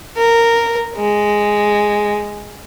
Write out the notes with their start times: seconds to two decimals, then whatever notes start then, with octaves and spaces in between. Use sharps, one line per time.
0.17 A#4
0.96 G#3